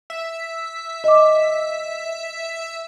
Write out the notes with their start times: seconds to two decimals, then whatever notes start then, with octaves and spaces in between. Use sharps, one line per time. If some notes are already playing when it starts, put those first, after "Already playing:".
0.10 E5
1.04 D#5 D6